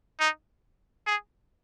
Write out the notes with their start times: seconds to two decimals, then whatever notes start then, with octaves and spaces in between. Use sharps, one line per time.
0.20 D#4
1.07 G#4